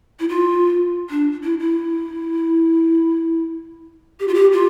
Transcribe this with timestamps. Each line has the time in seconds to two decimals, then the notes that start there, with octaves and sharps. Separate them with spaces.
0.19 E4
0.29 F4
1.10 D4
1.43 E4
1.59 E4
4.20 G4
4.28 F4
4.34 G4
4.52 F4